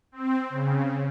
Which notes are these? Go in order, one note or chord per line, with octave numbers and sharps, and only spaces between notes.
C4
C#3